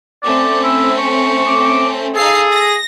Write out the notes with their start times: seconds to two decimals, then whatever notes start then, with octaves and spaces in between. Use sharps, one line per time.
0.23 A3 C4 C#4 D5
0.63 E4
0.98 C#6
1.47 D6
2.15 D#4 G#4 A4 F5 C7
2.52 A#6